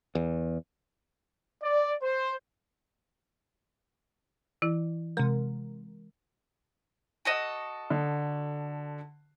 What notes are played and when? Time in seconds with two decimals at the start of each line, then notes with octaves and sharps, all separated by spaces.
0.15 E2
1.61 D5
2.01 C5
4.62 E3 E4
5.17 C3 G#3 A#4
7.25 F#4 A4 D#5
7.90 D3